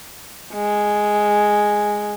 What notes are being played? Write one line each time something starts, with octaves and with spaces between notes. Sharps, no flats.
G#3